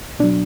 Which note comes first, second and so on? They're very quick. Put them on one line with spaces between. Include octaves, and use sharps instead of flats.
B2 D4 F#3